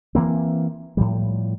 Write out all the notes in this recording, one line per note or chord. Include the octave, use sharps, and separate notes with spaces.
E3 F#3 A#3 C4
A2 F3 G3